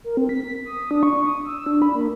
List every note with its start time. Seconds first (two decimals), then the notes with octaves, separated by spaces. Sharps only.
0.04 A#4
0.17 C4
0.29 B6
0.65 D#6
0.91 D4
1.03 C#6
1.26 D#6
1.45 E6
1.66 D4
1.82 B5
1.95 A#3